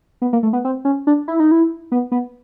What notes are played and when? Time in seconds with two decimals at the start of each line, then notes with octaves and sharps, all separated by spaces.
0.22 B3
0.33 A#3
0.43 A3
0.53 B3
0.65 C4
0.85 C#4
1.07 D4
1.28 E4
1.40 D#4
1.51 E4
1.92 B3
2.12 B3